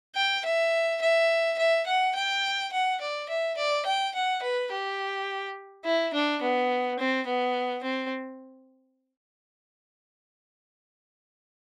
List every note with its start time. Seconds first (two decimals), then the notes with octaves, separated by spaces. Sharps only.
0.15 G5
0.45 E5
1.01 E5
1.58 E5
1.86 F#5
2.15 G5
2.72 F#5
3.01 D5
3.29 E5
3.57 D5
3.86 G5
4.14 F#5
4.42 B4
4.71 G4
5.85 E4
6.14 D4
6.41 B3
6.99 C4
7.26 B3
7.83 C4